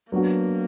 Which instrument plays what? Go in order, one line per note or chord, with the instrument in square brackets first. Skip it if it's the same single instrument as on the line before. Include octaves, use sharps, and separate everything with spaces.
[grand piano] F#3 B3 D4 F#4 [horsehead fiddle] A#3